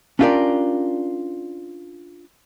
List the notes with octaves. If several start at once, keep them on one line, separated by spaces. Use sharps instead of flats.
C#4 D4 F4 G4 A#4 D5